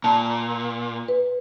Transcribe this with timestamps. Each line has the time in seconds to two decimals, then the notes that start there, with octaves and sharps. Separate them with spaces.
0.04 A#2 A5
1.08 B4